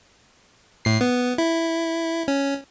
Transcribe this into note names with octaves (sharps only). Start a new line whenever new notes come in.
A2 C7
B3
E4
C#4